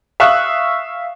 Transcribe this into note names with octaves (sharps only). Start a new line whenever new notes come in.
E5 F5 C#6 D#6 E6 F#6